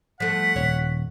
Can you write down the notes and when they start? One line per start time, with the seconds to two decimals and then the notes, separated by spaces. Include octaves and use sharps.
0.20 F3 A3 F#5 B6
0.56 D#1 C#5